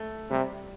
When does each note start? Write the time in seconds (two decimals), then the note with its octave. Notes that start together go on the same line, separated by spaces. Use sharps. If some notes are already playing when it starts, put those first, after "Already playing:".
Already playing: A3
0.30 C3 G3